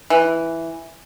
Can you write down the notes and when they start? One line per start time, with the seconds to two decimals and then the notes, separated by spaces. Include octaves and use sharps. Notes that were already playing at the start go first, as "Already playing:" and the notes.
0.10 E3